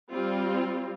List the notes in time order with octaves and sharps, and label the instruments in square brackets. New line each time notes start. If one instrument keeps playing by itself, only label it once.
[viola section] G3 C4 F4